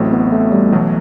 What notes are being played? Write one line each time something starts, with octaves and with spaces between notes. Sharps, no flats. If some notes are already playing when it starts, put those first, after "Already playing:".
Already playing: A1 A2 F#3 A3 C4
B3
A3
G3
B1 B2 E3 F#3 A3